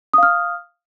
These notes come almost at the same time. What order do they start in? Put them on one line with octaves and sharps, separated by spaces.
D#6 F5 F6